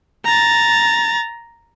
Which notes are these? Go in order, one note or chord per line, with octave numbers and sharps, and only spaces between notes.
A#5 A6